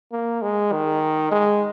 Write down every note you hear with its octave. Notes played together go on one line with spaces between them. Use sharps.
A#3
G#3
D#3
G#3